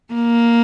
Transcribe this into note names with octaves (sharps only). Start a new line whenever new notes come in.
A#3